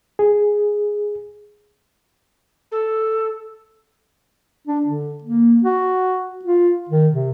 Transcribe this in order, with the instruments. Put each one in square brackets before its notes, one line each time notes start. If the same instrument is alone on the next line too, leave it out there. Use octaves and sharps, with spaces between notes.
[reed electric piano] G#4
[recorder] A4
[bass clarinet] D4
D3
A#3
F#4
F4
D#3
C3